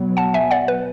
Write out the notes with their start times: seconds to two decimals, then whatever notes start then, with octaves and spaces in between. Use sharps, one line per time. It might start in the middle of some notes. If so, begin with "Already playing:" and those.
Already playing: B2 F#3 B3
0.17 F#5 A5
0.34 E5 G#5
0.51 D5 F#5
0.68 B4